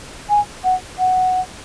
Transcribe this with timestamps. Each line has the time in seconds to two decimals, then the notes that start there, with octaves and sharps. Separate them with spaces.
0.29 G#5
0.64 F#5
0.99 F#5